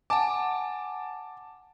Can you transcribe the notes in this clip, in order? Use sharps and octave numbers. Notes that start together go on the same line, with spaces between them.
F#5 G#5 A5 D6